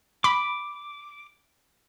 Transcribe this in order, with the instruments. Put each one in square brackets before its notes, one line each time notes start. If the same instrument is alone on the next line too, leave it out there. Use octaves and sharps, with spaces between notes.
[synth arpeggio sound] B5 [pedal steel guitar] D6